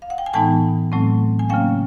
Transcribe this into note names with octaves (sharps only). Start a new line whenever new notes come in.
F5
F#5
G5
G#5
A2 E3 G#3 B3 D#4 G5 A5
A2 F#3 A3 C4
G#5
C#3 F#3 A#3 C#4 F5 G5